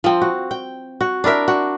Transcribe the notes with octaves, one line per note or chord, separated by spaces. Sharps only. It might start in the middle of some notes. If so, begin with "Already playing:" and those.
F3 C4
F#4
G5
F#4
D4 E4 A#4 E5
F#4